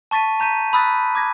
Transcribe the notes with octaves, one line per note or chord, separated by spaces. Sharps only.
A5 C#6 A6 B6 D#7
A#5 G6 B6 D#7
B5 D#6 E6 F#6 A6 B6
D6 G#6 A#6